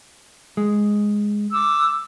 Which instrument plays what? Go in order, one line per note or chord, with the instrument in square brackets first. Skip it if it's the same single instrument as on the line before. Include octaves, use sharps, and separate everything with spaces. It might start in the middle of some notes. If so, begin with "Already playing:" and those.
[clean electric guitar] G#3
[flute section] D6 E6